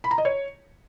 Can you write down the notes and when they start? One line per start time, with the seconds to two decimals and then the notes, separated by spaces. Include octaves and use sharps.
0.04 B5
0.11 A#5
0.18 D#5
0.25 C#5